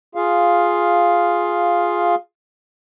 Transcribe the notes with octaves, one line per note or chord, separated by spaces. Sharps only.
F4 G#4 F5